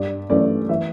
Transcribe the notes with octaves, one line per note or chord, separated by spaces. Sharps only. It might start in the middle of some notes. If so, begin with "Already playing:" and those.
Already playing: G2 D5
E3 A3 C#4 D5
E3 E5